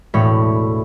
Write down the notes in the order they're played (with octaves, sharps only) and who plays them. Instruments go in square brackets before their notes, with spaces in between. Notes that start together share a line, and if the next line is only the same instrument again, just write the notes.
[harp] E1 A2 D4 C#5 B5